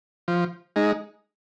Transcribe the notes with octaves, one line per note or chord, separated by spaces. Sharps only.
F3
G#3 D#4